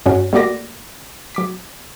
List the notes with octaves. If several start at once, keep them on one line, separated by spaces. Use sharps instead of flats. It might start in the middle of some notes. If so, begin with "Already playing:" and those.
G2 C#4 F#4
G3 A3 A#3 F#4 D5 A#6
F#3 D6 B6